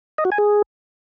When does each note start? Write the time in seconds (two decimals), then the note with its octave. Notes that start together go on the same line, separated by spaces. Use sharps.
0.18 D#5
0.25 F#4
0.32 G#5
0.38 G#4